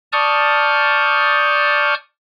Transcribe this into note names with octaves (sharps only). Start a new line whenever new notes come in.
D5 A5 C#6 D#6 F6 G6